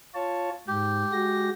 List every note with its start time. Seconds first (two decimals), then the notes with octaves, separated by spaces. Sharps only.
0.14 F4 C#5 A5
0.68 G#2 G4
1.12 G#3 F#4 A#6